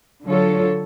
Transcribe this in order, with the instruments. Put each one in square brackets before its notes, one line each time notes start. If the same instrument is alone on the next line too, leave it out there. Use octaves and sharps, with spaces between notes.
[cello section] D3 F#3 F4 A4 C#5